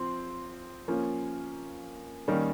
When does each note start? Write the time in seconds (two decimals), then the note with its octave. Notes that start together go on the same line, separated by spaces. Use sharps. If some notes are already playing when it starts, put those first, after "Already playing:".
Already playing: F3 C4 C6
0.88 F3 A#3 C#4
2.28 D#3 G3 A#3 C#4